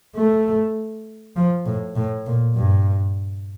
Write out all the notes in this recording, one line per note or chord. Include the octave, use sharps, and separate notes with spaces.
A3
F3
A2
A2
A#2
G2